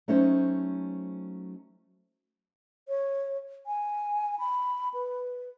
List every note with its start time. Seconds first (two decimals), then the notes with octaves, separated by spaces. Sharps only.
0.08 F#3 A3 C#4 D#4 C5 D#5
2.88 C#5
3.66 G#5
4.39 B5
4.94 B4